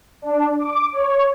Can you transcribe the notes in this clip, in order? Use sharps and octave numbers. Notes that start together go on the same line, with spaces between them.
D4
D6
C#5